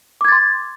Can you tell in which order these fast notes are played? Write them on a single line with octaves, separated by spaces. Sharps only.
D6 G#6 A6 C6